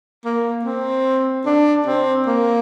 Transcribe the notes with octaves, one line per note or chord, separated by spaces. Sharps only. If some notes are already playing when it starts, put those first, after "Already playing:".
A#3
C4
D4
C4
A#3